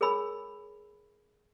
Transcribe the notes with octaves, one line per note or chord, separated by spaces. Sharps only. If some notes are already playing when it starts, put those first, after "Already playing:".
G#4 A#4 C#5 G#5 B5 E6